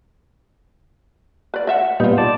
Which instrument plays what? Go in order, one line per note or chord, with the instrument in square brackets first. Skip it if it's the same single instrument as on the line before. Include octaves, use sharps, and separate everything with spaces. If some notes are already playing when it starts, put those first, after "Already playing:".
[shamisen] B4 D5
D#5 E5 F#5
[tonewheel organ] A#2 G3 B3 [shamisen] D#4 F4
[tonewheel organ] D5 A5